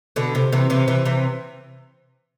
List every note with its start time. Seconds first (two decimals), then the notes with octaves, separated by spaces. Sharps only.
0.16 B2 D3
0.35 C3
0.52 C3 E3
0.70 C3 E3
0.88 C3 E3
1.05 C3 E3